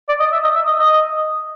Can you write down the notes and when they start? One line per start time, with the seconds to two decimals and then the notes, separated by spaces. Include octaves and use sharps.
0.09 D5
0.20 D#5
0.32 E5
0.44 D#5
0.55 E5
0.67 D#5
0.79 D#5